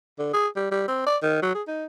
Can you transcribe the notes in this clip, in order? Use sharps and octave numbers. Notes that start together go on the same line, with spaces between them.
D3
G#4
G3
G3
C4
D5
D#3
F#3
G#4
D#4